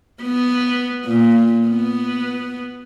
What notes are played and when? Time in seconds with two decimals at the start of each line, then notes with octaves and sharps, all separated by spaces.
0.23 B3
1.05 A#2
1.67 B3